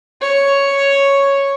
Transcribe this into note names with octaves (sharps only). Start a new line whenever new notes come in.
C#5